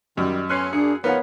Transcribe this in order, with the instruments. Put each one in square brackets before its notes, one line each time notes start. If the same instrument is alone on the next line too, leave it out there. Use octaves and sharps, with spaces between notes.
[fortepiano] F#2 [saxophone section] D#3 G3 [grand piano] D#5
[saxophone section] A3 B3 C#4 [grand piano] C6 F#6 C7
[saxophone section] A#3 G#4 [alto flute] D4 [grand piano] C#7
[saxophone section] F2 F3 D#4 [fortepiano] B3 [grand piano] A#4 F5 F#5 [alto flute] C#5